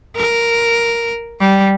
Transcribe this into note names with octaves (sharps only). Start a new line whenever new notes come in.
A#4
G3